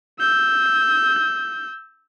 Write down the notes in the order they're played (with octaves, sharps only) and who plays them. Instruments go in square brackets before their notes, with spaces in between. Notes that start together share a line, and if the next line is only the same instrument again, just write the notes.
[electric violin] E6 G6